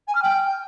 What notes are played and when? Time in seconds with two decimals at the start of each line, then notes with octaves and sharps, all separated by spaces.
0.07 G#5
0.14 F6
0.22 G5